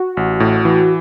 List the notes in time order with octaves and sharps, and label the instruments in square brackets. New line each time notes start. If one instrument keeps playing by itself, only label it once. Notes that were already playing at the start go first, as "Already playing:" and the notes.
Already playing: [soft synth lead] F#4
[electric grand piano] A1
A2
E3